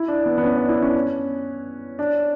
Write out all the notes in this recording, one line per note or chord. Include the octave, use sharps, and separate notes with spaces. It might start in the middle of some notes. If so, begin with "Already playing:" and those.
Already playing: E4
D4
B3
B3
C#4
D4
E4
C#4
D4